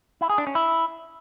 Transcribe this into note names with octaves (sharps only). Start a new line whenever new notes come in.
E4
G#4
D4
C#4
E4